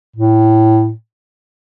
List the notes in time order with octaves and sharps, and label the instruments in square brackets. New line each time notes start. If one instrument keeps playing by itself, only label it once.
[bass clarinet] A2